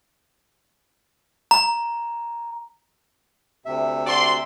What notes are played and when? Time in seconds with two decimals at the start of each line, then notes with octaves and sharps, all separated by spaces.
1.51 A#5
3.66 D2 C3 E5
4.07 F#4 D5 C6